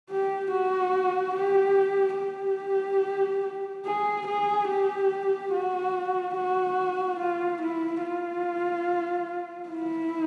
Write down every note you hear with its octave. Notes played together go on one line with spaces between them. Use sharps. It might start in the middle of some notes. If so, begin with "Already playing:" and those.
G4
F#4
G4
G4
G#4
G#4
G4
F#4
F#4
F4
E4
F4
E4